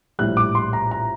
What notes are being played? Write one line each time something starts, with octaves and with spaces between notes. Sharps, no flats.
A#1 A2 G3 F#6
D6
C6
A#5
A#5